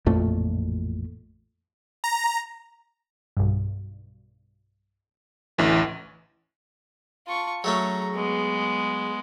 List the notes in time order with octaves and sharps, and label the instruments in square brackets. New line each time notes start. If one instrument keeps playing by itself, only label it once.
[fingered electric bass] A1 F2 A#2 A3
[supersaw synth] A#5
[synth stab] B1 G2
[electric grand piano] A1 D2 [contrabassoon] E3
[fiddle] F4 C#6 [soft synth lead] A5
[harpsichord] F#3 A3 C#4 [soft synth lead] G#4 [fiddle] A#5
[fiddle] G#3 B3